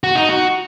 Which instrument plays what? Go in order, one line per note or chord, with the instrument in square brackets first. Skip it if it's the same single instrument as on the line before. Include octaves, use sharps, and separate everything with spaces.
[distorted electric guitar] F#4
D#4
F#4